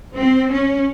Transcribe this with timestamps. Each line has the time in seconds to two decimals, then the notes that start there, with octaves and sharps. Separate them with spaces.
0.14 C4
0.52 C#4